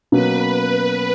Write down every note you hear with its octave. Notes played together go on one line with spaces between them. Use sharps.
B2 F#3 A#3 C#4 B4